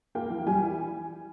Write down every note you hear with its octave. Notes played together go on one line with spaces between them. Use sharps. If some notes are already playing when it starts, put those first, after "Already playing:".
A#3 G5
E3
G3 G#5
E3